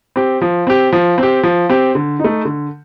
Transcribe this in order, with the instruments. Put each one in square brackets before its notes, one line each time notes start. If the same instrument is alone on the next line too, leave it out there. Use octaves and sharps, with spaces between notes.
[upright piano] C4 G4
F3
C4 G4
F3
C4 G4
F3
C4 G4
D3
A3 D#4
D3